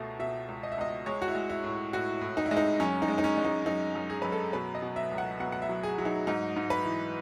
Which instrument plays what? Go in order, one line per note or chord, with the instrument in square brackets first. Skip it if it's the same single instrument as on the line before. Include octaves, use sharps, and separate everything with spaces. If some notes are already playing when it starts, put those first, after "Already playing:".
Already playing: [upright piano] C#2 B2 A3
B2 E5
C#2
D#5
E5
C#2 D#5
G#3 C#5
F#4
E4
G#3
E4
A2
A2 F#4
A2
D#4
E4
G#3
D#4
F#2 C#4
D#4
G#3
D#4
C#4
G#3
D#4
F#2 D#4
F#2
G#4
F#2 B4
A4
B2 B4
D#5
B2
E5
C#2
F#5
B2 F#5
F#5
E5
F#3
G#4
F#3
D#4
G#2 D#4
G#2
B4
E3